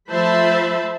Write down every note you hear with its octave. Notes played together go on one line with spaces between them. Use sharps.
F3 A3 C5 E5 A5 B5